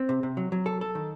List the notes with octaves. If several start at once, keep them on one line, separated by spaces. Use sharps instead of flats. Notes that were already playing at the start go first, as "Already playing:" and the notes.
Already playing: C4
C3
C3
F#3
F#3
A4
A4
D#3